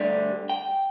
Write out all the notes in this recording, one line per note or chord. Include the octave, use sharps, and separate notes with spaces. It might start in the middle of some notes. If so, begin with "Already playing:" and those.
Already playing: D2 D3 G3
G5